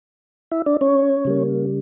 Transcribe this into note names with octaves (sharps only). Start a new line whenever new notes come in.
E4 E5
D4 D5
C#4 C#5
C#3 G3 A#3